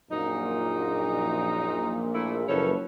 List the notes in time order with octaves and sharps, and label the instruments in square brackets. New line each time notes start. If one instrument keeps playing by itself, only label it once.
[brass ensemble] A#1 A#2 [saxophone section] F#2 D#4
[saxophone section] A3 E4
[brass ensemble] F#1 B4 [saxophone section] F3 A4 C#5